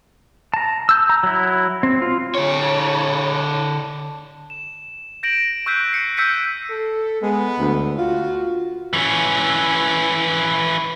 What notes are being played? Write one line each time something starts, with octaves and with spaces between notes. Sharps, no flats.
A5 A#5
E6 G6
A#5
F#3 E4
C4
F4
D3 C#5
E7
G6 A#6 D7 E7 F#7
C#6 E6 F#6 G6 B6 C7
C7 C#7
E6 G6 B6 C#7 D#7
A4
G#3 B3
D2
F4 F#4
E3 C#4